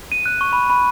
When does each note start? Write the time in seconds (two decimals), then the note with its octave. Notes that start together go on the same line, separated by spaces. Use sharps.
0.12 D#7
0.26 F#6
0.41 C#6
0.53 B5
0.70 B5